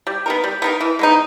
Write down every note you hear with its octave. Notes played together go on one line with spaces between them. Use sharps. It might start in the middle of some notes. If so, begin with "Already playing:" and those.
G3
B3 D#4 A#4
G3
B3 D#4 A#4
E3
G#3 B3 D#4